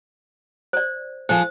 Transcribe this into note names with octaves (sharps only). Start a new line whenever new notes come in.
C5 D5
F3 G#4 A4 C5